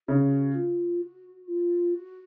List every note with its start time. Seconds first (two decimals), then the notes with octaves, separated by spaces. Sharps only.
0.08 C#3 F#4
0.31 F#4
0.55 F4
1.01 F#4
1.48 F4
1.94 F#4